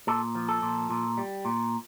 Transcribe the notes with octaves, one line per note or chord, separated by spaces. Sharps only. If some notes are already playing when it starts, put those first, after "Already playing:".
A#2 A4
F3
A4
A#2
A#2
G3
A#2